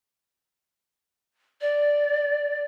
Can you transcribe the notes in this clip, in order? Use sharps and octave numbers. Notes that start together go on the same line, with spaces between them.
D5